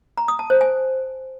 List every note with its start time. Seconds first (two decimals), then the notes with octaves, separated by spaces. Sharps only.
0.17 A#5
0.28 D#6
0.39 A5
0.50 C5
0.61 G#5